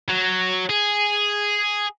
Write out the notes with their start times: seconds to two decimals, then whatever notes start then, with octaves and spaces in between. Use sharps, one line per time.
0.09 F#3
0.70 G#4